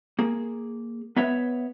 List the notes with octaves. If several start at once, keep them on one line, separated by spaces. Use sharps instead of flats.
A#3 G#4
B3 B4 C#5 E5